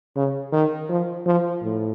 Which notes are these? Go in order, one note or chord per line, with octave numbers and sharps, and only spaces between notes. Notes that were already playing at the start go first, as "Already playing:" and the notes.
C#3
D#3
F3
F3
A2